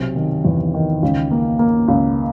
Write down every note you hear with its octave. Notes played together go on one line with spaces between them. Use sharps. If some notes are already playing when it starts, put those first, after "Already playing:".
Already playing: B1 C3
D#3
E2
D#3
C#2
A#3
A#3
C#2